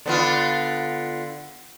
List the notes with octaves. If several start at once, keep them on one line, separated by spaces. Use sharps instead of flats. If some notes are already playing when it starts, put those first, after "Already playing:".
D3 B3 F4